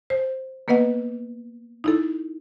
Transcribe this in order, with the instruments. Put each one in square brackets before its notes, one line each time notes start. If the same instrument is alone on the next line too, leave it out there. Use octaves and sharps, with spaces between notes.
[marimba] C5
A#3 B3 B4 D#5 F#5
D#4 E4 A4